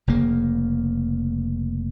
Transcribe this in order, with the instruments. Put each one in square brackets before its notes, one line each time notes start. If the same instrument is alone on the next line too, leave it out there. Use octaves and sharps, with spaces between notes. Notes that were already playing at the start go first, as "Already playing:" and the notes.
[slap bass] F1 C#3 A#3